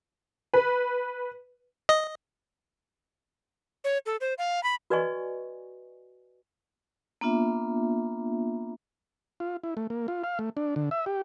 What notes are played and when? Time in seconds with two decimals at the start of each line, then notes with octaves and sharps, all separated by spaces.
0.54 B4
1.89 D#5
3.84 C#5
4.06 A4
4.21 C5
4.38 F5
4.63 B5
4.90 F#4 B4 D5 D#5 G#5 C#6
7.21 A#3 B3 D4 F4 E5
9.40 F4
9.64 E4
9.77 A3
9.90 A#3
10.08 F4
10.24 F5
10.39 A3
10.57 D4
10.76 D3
10.91 E5
11.06 G4